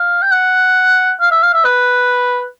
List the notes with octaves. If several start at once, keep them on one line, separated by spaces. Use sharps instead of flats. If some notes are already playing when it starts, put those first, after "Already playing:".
Already playing: F5
G5
F#5
F5
E5
F5
E5
B4